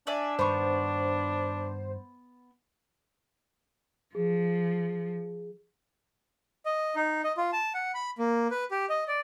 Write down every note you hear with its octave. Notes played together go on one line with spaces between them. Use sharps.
D4 D5 E5 G#5
G2 D#3 B3 C5 C#6
F3 G#4
D#5
D#4
D#5
F4
A5
F#5
B5
A#3
B4
G4
D#5
D5